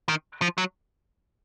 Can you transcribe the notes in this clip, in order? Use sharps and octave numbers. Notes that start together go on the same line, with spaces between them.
D#3
F3
F#3